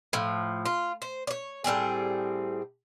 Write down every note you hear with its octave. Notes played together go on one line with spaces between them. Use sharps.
A2 F3
F4
C5
C#5 D5
A2 G3 C4 G#4